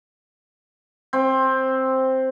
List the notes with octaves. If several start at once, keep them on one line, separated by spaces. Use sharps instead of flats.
C4